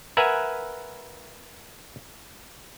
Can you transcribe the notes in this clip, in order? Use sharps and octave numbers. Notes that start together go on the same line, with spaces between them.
A#4 B4 E5 F#5 G#5